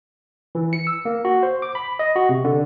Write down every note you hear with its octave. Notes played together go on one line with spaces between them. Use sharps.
E3
C#7
E6
A#3
F#4
C5
D6
B5
D#5
F#4
C3
D3